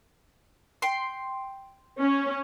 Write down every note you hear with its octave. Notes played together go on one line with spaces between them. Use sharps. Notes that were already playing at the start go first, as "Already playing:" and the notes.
G5 C6
C#4